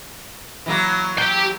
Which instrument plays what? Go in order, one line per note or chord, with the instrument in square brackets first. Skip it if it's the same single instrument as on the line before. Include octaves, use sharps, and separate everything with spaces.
[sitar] E3 F#3 A#3
[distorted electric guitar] G4 G5